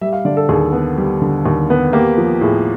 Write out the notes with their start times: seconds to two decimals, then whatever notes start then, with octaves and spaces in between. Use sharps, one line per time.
0.01 G3 E5
0.13 F5
0.25 D3 D5
0.37 A4
0.49 D#2 G#4
0.73 B3
0.98 G3
1.22 D3
1.46 D#2
1.70 B3
1.93 A#3 G4
2.17 F3
2.41 A2 G#4